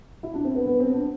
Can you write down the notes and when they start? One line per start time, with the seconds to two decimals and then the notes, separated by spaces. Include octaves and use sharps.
0.23 E4
0.34 D4
0.45 C4
0.55 B3
0.66 B3
0.80 C4
0.94 D4